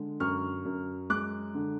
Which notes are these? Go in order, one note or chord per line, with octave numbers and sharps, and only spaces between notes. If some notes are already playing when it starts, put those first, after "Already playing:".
Already playing: D3 G#3
F#2 C#6 F6
F#2
G#3 D6 F#6
D3